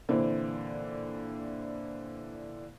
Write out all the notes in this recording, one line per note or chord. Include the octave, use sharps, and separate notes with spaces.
A#2 D3 E3 C4